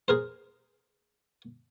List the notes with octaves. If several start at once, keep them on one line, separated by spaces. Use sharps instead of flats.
G#4 A#4 C5